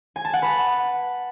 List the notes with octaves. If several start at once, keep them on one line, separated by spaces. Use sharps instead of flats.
G#5
A5
F#5
B4